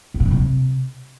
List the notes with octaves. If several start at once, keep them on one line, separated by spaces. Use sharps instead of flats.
E2
B2
D3
G2
C3